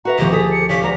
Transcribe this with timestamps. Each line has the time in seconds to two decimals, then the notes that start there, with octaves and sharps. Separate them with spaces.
0.05 F#4 B4 E5 A#5
0.18 D2 G#2 B2 D#3 F3 C4 G4
0.32 G#4 A4 A5 D#6 B6
0.52 C#7
0.69 C#3 G4 B6
0.83 E2 G#3 C4 D4 A#5